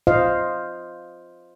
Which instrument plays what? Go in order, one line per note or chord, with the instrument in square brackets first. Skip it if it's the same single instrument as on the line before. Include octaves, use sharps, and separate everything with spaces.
[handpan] F4 C5 D#5 F5